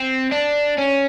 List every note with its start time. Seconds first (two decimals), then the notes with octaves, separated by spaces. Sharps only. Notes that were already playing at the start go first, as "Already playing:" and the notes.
Already playing: C4
0.32 D4
0.78 C#4